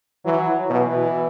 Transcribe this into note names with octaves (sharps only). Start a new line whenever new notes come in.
E3 F#3
B2 E3